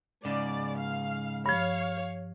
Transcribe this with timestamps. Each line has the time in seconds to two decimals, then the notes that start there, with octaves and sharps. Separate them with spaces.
0.25 G#2 C#3 D5
0.79 F5
1.46 G2 F3 C#5 F5